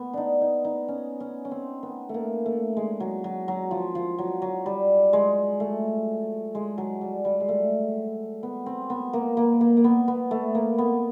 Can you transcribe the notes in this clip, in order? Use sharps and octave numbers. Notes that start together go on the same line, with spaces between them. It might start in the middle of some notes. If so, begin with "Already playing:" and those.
Already playing: B3
D4 D#4
D#4
D#4
C#4
C#4
C#4
C4
B3
A3
A#3
A3
G#3
F#3
F#3
F#3
F3
F3
F#3
F#3
G3
G#3
A3
G#3
F#3
G3
G3
G#3
A3
B3
C4
B3
A#3
A#3
A#3
A#3
B3
B3
A3
A#3
B3